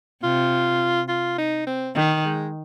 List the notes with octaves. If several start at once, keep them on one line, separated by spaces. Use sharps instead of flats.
C3 F4
F4
D#4
C4
D#3
G#3